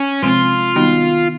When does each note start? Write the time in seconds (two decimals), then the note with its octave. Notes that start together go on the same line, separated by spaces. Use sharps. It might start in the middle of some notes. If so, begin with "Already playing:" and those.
Already playing: C#4
0.23 C3 F3 G#3 C4 F4
0.75 D#3 G3 B3 D#4 F#4